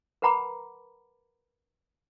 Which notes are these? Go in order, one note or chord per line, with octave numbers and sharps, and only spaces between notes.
A#4 B4 F#5 A#5 B5 D6